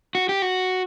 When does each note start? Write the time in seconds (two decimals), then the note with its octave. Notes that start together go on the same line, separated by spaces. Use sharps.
0.15 F#4
0.29 G4
0.42 F#4